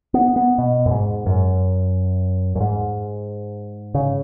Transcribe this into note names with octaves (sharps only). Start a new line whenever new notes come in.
B3
B3
B2
F#2
G#2
F#2
F#2
G#2
C#3